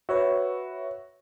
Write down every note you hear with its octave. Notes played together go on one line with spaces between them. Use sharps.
F#4 B4 C#5 E5